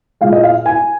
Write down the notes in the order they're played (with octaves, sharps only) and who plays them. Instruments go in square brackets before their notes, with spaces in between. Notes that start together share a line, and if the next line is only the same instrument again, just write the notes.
[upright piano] A#2 G#3 F5
D#5
F5
G#5